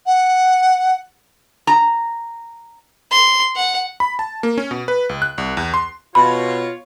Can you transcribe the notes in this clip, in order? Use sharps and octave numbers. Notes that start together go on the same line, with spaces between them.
F#5
A#5
C6
F#5
B5
A5
A#3
C#4
B2
B4
C#2
F#6
C2
E2
C6
B2 F4 C#5 B5